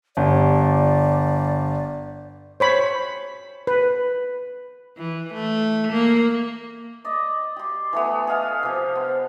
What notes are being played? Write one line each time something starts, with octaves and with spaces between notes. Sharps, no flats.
G1 D5
C5 C#5 B5
B4
E3
A3
A#3
D5 D#5
G4 C6
E3 A3 B3
G#4 D#5 F5
C3 F3
B3